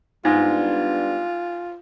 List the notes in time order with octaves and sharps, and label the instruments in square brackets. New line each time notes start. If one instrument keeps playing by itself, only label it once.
[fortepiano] G#2 [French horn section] G3 B3 D4 [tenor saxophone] F4